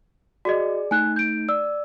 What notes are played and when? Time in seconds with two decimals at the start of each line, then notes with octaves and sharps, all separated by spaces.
0.45 F#4 G#4 D5 D#5
0.91 A3 D#4 G#5 F#6
1.16 G6 D7
1.49 D5 E6